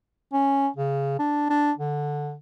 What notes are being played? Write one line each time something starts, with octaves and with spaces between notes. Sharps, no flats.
C#4
C#3
D4
D4
D3